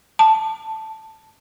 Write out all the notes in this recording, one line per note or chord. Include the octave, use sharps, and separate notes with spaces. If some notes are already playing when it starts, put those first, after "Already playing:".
A5